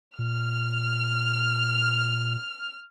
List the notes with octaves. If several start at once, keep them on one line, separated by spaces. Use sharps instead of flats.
A#2 F6